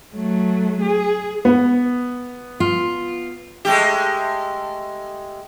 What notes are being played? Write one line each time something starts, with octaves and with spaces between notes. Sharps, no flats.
F#3 A3
G#4
B3
F4
G#3 A3 G4